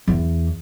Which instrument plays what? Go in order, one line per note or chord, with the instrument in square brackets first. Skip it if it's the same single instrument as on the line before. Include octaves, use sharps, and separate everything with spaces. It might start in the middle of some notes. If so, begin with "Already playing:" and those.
[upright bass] E2